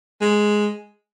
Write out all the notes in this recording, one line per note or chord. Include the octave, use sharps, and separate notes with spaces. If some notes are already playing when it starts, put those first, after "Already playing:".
G#3